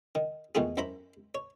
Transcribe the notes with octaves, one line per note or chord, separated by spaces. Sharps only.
D#3
E2 B2 D#3 A3 F4 G#4
F#2 E4 C5 A#5 B5
C#5